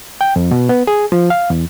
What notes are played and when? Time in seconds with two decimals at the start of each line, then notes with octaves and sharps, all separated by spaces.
0.21 G5
0.36 F2
0.51 B2
0.69 B3
0.87 G#4
1.12 F3
1.30 F5
1.50 E2